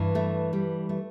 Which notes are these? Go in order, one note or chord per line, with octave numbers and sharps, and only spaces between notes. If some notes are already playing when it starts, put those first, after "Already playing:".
Already playing: G2 E3
A3
G3
A3